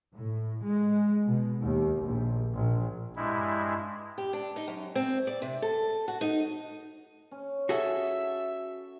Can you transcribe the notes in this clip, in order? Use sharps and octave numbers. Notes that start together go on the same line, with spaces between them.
A2
G#3
B2
D#2
A#1
A#1
G2 G#3 E4
G4
D4
D#4
F#2
C4
D5
C3
A4
F#4
D#4
C#4
F#4 G#4 A4 E5